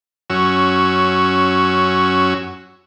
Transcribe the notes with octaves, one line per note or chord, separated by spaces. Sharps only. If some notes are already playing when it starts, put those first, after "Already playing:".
F#2 C#4 F#4 E6